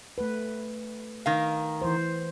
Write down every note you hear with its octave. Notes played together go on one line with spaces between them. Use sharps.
A3 B4
D#3 F5
E3 C5